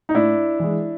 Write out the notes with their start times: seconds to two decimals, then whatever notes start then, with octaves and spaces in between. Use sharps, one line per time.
0.09 D#4
0.14 A2 D4 E4
0.60 E3 G#3